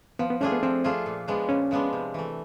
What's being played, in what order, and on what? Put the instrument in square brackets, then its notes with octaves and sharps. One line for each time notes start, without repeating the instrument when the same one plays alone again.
[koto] F3 [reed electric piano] B3
[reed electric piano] B3
[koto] A3 D4 F4 G#4 [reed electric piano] C#4
[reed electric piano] B3
[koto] F3 [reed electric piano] C4
[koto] A3 D4 F4 G#4
A#2
F3 G#3 B3 D4
[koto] A#2 [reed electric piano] C#4
[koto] F3 G#3 B3 D4
C3
E3 A3